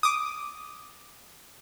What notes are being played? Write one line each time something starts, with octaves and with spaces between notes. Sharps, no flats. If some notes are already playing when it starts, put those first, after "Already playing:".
D6 D#6